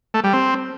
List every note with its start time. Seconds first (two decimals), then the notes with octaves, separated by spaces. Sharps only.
0.14 A3
0.24 G3
0.33 C4